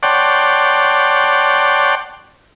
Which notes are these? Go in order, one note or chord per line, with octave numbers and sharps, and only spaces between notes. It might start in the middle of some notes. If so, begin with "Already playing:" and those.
C#5 D5 F#5 G5 A5 C6